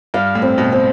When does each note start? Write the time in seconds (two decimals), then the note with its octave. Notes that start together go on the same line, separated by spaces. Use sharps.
0.14 G2 F5
0.35 A2
0.42 C4
0.58 B2
0.72 C4